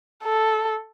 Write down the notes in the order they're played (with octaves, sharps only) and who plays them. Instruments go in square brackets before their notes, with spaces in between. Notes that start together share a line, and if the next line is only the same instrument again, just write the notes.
[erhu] A4